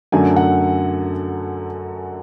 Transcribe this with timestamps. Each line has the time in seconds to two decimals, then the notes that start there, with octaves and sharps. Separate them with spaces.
0.12 F#2 D3 F#3 A3 G#5
0.36 F#5